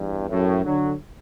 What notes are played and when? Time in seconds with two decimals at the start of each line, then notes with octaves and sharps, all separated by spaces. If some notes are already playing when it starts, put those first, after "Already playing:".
Already playing: E2 G2
0.30 F#2 A2
0.63 D3 F#3